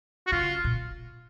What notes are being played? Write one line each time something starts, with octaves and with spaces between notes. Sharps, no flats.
F#4
C#3 F4
A#2